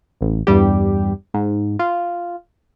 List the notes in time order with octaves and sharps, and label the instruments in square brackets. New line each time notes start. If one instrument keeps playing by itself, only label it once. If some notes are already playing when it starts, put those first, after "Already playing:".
[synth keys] A1
E2 G2 G3 G4
G#2
F4